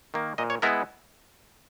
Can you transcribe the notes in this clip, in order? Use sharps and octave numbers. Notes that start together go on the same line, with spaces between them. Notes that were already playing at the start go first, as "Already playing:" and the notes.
D#3 A#3
A#2 D#5
C#5
G#3 B3 E4 A#4